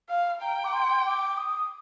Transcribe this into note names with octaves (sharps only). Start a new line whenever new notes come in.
F5
G5 A#5
D6
C6
D6
D#6